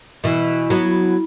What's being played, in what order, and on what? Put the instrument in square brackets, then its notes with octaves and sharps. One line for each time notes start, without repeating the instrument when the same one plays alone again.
[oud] B2 E3 [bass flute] E4
[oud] F#3 B3